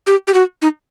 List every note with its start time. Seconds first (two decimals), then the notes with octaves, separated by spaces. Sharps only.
0.07 G4
0.27 G4
0.34 F#4
0.62 D#4